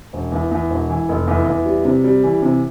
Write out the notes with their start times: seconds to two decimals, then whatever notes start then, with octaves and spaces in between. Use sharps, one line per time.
0.13 E1
0.32 E2
0.51 E2
0.70 E1
0.89 E3
1.09 F1
1.28 E2
1.47 E2
1.66 G3
1.85 C3
2.04 G3
2.23 E3
2.42 C3